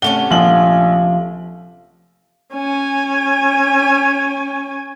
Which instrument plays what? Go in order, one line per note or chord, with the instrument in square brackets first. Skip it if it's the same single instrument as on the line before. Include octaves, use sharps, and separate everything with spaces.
[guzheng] C3 A3 C#4 [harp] F#5 [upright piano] G7
[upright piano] A#1 F#7 [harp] F3
[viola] C#4 G#5